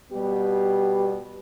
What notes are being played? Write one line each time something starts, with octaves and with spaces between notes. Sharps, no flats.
B2 G3 B3 G4